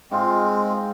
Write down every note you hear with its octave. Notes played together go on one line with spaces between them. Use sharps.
G#2 G#3 C4 F4 F5